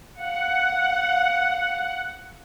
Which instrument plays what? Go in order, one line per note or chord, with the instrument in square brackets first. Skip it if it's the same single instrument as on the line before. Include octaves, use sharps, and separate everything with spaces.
[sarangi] F5 [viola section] F#5